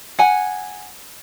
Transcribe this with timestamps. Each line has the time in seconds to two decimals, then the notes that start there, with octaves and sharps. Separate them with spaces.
0.19 F#5 G#5